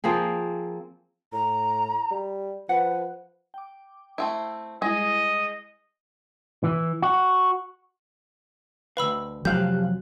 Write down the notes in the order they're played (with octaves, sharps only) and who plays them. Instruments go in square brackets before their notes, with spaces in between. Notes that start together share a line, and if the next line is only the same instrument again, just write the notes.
[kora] F3 A#3 C4 G#4
[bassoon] A2 [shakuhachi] A#5
[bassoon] G3
[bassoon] F3 [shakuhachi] B4 [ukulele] F#5
[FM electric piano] G5 D6
[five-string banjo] A3 C4 E4
[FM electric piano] G3 G#3 E4 [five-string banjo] G#4 [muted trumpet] D#5
[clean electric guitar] E3
F#4
[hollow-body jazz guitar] D2 B2 F5 [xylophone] B4 B5 E6
[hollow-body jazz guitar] F2 C3 C5 [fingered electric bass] F#3 [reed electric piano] G4 F5 F#6 [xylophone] G6